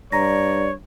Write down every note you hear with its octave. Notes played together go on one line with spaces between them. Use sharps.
G2 C#5 D5 A#5 A#6